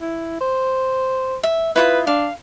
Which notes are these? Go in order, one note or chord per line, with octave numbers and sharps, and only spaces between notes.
E4
C5
E5
E4 F4 B4 D#6
D4 F5